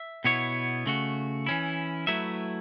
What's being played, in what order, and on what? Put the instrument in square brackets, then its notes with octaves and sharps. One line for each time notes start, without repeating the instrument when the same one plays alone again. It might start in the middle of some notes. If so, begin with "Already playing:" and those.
Already playing: [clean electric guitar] E5
B2 B3 E4 C#5
C#3 A3 F#4
E3 C#4 E4
F#3 A3 E4 B4 E5